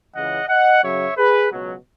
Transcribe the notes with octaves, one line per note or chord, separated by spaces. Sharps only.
C#2 C#3 E3 D#5 F#5
D#5 F#5
F#2 C#3 F#3 C#5 E5
G#4 B4
C#2 B2 F#3